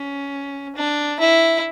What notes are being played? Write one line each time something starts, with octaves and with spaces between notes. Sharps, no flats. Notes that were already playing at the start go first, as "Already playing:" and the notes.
Already playing: C#4
D4
E4